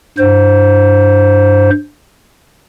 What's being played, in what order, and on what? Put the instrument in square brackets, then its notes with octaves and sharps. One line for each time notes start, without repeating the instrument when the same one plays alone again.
[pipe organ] G2 C5